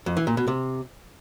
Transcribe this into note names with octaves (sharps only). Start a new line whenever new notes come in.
F2
E3
A#2
B2
C3